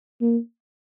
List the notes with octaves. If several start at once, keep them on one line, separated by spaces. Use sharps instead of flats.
A#3